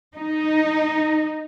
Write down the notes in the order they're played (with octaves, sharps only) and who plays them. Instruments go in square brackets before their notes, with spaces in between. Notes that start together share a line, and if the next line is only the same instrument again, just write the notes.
[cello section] D#4